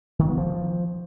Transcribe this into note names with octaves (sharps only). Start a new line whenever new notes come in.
D#3
B3
F3